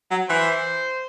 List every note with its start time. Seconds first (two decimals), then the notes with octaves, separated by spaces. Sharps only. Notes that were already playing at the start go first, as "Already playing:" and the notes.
0.11 F#3
0.29 E3 C5